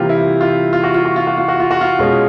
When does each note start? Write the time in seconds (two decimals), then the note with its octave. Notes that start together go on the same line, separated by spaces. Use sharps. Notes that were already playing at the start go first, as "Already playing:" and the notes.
Already playing: C3 E3 G3 A#3 F4 G4
0.09 E4
0.41 F4
0.73 F4
0.83 F#4
0.94 F4
1.05 F#4
1.16 F4
1.27 F#4
1.37 F4
1.48 F#4
1.60 F4
1.70 F#4
1.81 F4
1.99 B2 G#3 C#4 F4